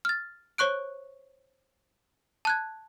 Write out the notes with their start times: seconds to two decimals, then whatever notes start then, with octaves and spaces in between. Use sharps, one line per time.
0.05 F6 A6
0.58 C5 C#5 C#6 F#6 D7
2.45 A5 F#6 G#6